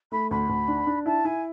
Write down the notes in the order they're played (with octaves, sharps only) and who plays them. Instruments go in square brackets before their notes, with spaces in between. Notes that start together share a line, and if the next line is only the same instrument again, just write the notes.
[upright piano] A3 [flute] B5
[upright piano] D2 [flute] B5
[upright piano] D2
D4
D4
[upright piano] E4 [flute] A5
[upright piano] E4 [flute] G#5